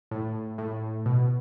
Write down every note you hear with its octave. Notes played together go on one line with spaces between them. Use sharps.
A2
A2
B2